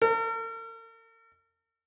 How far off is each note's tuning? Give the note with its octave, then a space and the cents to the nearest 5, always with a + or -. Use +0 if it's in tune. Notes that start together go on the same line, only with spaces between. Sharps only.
A#4 -45